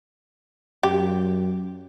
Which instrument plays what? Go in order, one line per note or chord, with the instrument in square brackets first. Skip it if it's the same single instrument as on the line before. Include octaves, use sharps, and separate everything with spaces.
[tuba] F#2 [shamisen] G4